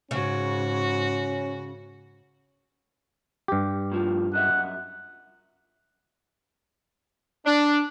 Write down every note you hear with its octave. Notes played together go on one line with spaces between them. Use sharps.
G#2 C#3 C#4 F#4
G2 G4
A2 F3
F#2 D#5 E5 F#5
D4